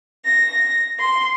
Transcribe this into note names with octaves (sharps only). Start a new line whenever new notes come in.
A#6
C6